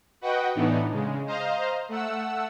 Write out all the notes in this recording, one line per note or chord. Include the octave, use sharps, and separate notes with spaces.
F#4 B4 D#5 F#5 G5
A2 E3 B3 D4 D#4
C#3 G#3
C5 D#5 F5 A#5
A3 F#5 E6